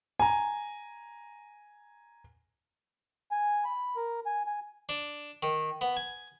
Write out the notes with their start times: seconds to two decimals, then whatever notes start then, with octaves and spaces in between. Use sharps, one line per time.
0.19 G#5 A#5
3.31 G#5
3.64 B5
3.96 A#4
4.26 G#5
4.47 G#5
4.89 D4
5.43 D#3
5.81 B3
5.97 G#5